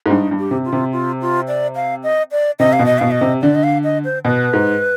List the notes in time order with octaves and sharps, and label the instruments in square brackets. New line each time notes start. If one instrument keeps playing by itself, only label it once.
[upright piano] G#2
[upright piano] G2 [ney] D#4
[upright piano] G2
[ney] G4
[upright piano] C3
[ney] F4
[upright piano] C3
[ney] F4
F4
D5
F5
D#5
D5
[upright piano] C3 [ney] D#5
[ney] F5
[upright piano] B2
[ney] D#5
[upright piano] B2 [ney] F5
[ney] D#5
[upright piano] C3
[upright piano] D3 [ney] D5
[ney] D#5
F5
D#5
C5
[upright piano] B2 [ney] B4
[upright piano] G#2